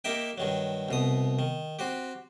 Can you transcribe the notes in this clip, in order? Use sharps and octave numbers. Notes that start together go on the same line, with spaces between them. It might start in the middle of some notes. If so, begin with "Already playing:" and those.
A#3 D#4 G4 A#4 E5 G5
G2 D#3 F#3
C2 B2 D#6
D#3
C4 F#4 G4